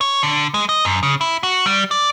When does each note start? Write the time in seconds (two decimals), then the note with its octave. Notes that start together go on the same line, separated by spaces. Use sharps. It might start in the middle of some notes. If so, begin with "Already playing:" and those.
0.01 C#5
0.23 D3
0.54 G#3
0.69 D#5
0.85 F#2
1.03 C#3
1.21 E4
1.43 F#4
1.66 G3
1.91 D5